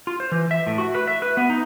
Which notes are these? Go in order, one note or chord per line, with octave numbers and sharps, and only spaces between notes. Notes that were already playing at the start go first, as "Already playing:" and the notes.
F4
C5
E3
E5
A2
F#4
B4
E5
B4
B3
D#4